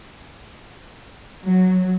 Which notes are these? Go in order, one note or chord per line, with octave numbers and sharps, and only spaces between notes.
F#3